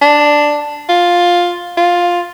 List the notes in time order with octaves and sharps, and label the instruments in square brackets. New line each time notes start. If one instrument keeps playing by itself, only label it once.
[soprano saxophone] D4
F4
F4